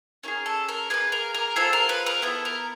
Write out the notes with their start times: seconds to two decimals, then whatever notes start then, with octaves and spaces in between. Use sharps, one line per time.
0.24 C#4 E4 G#4 A#4
0.46 A4
0.69 A#4
0.90 A#3 D#4 G#4 B4
1.12 A#4
1.34 A#4
1.56 C4 F4 G#4 A4
1.73 A#4
1.89 B4
2.06 A#4
2.22 B3 E4 A4
2.45 A#4